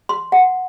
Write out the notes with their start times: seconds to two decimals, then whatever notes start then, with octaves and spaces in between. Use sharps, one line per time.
0.09 C6
0.32 F#5